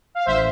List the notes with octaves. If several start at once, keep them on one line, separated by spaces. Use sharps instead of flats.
F5
A1 C5 E5